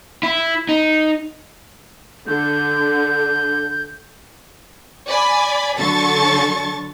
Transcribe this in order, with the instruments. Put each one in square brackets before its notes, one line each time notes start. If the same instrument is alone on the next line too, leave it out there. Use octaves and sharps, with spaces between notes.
[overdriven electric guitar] E4
D#4
[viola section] D3 [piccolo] G6
[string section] D5 G#5 B5
D3 F#3 A4 C#6 A6